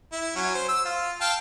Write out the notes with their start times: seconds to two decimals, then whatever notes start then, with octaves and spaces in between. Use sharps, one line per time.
0.12 E4
0.36 F#3 C#4
0.55 C5
0.69 E6
0.85 F4
1.21 F5 G5 A5